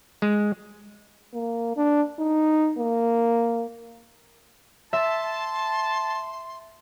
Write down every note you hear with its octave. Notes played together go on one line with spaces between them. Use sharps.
G#3
A#3
D4
D#4
A#3
E5 A5 C6